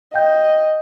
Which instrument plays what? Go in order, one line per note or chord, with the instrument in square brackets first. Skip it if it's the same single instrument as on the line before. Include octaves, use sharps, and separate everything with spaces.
[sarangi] D#5 [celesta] F5 G5 G6